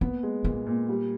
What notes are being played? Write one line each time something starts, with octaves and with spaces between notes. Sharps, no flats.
A#3 B3
G#3
A#2 A#3
A#2
G3